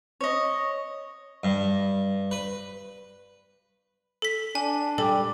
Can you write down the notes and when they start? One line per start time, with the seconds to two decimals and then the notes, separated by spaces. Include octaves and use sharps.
0.21 C#5 D#5
1.44 G2
2.31 B4
4.22 A4 B6
4.55 D4 G#5
4.98 G3 A4 D5